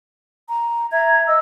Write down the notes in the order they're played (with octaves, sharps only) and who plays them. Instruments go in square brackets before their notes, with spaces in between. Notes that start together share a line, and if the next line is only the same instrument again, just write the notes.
[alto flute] A#5
[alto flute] E5 [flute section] A#5 G#6
[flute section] D#5 E6